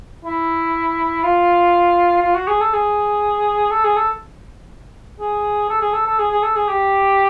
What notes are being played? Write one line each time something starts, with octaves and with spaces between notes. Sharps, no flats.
E4
F4
F4
F#4
G#4
A4
G#4
A4
G#4
A4
G#4
A4
G#4
A4
A4
G#4
G#4
A4
G#4
G4